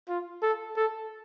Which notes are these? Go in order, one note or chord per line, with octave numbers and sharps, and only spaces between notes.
F4
A4
A4